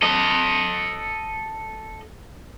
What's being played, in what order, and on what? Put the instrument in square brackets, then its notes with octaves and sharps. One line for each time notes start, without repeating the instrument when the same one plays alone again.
[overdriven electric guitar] A4 D#5